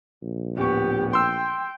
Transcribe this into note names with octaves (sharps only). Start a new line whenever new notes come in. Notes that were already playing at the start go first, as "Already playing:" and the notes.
A#1
D1 B3 G4 C#6
G5 C6 E6